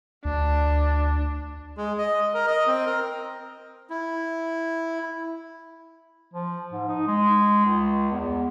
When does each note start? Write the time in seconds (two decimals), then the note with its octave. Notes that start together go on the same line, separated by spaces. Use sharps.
0.25 D2 D4
1.78 G#3
1.98 D#5
2.34 A#4
2.47 D#5
2.67 C4
2.86 A#4
3.90 E4
6.34 F3
6.73 G#2
6.89 D#4
7.07 G#3
7.65 C#2
8.11 E2